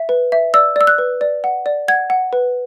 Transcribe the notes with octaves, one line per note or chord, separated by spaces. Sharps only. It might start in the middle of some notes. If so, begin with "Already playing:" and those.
Already playing: E5
B4
E5
D5 E6
D5 E6
F#6
B4
D5
F#5
D5
F#5 G#6
F#5
B4